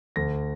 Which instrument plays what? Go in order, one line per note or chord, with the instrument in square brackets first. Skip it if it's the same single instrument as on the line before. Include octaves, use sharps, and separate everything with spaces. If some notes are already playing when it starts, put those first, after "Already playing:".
[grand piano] D2 A#6